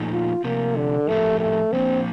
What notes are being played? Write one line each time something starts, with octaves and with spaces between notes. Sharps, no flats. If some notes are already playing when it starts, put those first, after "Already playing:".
Already playing: A#2 F3 A3 D#4
F4
C3 F3 A#3 C4
D3
A2 F3 A3 C4 G4 A#4
A3
F3 A#3 C4 D4